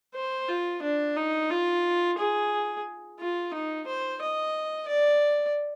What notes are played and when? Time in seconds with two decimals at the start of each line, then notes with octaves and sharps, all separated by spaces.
0.15 C5
0.48 F4
0.83 D4
1.16 D#4
1.50 F4
2.18 G#4
3.19 F4
3.54 D#4
3.87 C5
4.21 D#5
4.88 D5